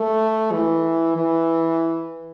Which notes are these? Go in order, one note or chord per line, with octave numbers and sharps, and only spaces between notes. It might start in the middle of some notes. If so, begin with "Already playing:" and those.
Already playing: A3
E3
E3